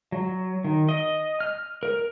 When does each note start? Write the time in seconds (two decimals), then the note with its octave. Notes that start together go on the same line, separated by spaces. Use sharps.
0.12 F#3
0.65 D#3
0.89 D#5
1.41 F6
1.83 A#4